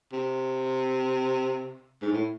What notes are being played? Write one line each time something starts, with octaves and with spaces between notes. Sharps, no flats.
C3
G#2
A2